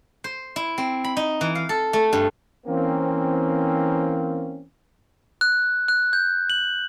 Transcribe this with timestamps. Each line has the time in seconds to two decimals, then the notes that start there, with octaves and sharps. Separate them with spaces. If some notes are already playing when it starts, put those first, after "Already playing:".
0.24 C5
0.56 E4
0.78 C4
1.04 B5
1.17 D#4
1.41 E3
1.55 F5
1.69 A4
1.93 A3
2.13 G2
2.67 E3 A#3 C4 C#4
5.41 F#6
5.88 F#6
6.13 G6
6.50 F#7